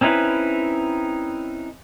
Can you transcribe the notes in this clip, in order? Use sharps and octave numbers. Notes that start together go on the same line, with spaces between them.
C4 C#4 D#4 E4 B4